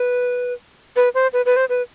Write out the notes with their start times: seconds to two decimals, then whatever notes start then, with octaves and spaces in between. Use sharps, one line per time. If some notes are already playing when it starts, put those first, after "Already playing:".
Already playing: B4
0.96 B4
1.15 C5
1.33 B4
1.46 B4
1.56 C5
1.69 B4